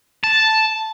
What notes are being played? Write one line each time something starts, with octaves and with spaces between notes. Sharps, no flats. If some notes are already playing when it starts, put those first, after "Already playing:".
A5